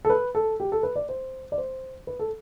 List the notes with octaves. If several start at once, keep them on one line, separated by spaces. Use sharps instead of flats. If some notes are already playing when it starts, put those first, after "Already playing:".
A4
B4
A4
G4
A4
B4
D5
C5
D5
C5
B4
A4